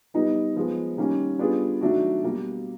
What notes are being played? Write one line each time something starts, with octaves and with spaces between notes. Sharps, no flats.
G3 B3 D#4 G4
F3 G#3 B3
D#3 G3 A#3 C#4
G3 B3 D4 F4 G#4
D#3 F#3 A3 D4 F#4
B2 G3 A#3